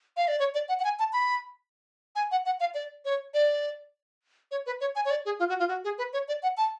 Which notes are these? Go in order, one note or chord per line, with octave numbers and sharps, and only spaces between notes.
F5
D5
C#5
D5
F#5
F#5
G#5
A5
B5
G#5
F#5
F#5
F5
D5
C#5
D5
C#5
B4
C#5
G#5
C#5
D5
G#4
F4
F#4
F4
F#4
G#4
B4
C#5
D5
F#5
A5